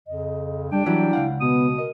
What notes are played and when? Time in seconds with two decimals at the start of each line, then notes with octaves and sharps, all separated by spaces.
0.07 F2 C#3 D#5
0.72 G3 D4 G5
0.86 E3 F#3 G3 E4
1.13 C#2 F5 F#5
1.41 B2 B3 D#6
1.78 A#4 D#5